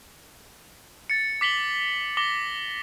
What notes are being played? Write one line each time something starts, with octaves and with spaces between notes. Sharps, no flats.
A6 C#7
D6 B6 F#7 G7
D6 A#6 G7